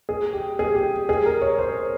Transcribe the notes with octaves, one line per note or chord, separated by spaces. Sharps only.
G#4
G4
G#4
G4
G#4
A#4
C#5
C5